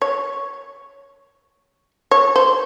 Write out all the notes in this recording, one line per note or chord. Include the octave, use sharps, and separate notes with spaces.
C#5
C#5
C5